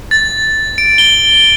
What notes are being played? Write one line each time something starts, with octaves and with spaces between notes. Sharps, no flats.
A6
D7
G7